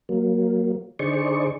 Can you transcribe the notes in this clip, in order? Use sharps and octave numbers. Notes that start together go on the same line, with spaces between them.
F#3 A#3
D3 D#4 G#4 C5 D5 C#6